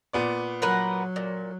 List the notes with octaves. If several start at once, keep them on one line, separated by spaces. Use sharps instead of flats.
A#2 B3 D5
F#3 A#4 B4 F#5
A#2